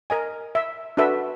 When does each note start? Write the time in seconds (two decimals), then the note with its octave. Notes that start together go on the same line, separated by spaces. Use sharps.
0.10 A#4 D#5 G#5
0.55 E5
0.97 D4 F#4 A4 B4 E5